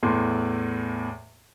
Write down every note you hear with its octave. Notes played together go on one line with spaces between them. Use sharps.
E2 A2 C6